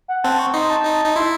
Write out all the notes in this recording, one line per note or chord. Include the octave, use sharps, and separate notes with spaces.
F#5
C4 A5
C#6
D#4 C6
A5
D#4
D#4
E4 C6